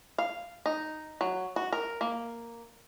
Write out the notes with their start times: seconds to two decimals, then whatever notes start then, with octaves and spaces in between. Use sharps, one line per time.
0.18 F5
0.66 D#4
1.21 F#3
1.56 F#4
1.73 A#4
2.01 A#3